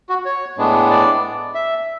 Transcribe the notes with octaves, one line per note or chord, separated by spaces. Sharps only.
F#4
C#5
A2 G#3 B3 D4
D5
E5